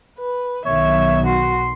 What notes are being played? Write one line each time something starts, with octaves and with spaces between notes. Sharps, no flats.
B4
B1 B2 D#3 C#5 E5
F#4 C6